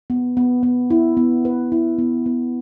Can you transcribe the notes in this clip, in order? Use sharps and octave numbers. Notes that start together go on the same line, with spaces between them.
B3
B3
B3
E4
B3
B4
E4
B3
B3